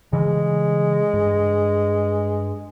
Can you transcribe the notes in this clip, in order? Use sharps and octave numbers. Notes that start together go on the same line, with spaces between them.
C#3 E3 G3 G#3
G2